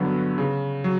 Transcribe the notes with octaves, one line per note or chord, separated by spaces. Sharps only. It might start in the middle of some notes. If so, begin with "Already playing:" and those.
Already playing: G2 D3 F#3 B3
C#3
F#3